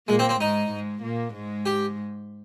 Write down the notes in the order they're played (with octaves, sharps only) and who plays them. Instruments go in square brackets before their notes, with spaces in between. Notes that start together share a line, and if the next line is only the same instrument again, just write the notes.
[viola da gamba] A#2 A#3 [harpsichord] G#3
[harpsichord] C4
C4
[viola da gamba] G#2 G#3 [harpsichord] D#4
[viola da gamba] G#2 G#3
A#2 A#3
G#2 G#3
[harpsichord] G4